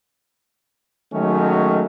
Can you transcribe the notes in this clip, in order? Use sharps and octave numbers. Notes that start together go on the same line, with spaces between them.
D#3 F#3 G#3 A3 C#4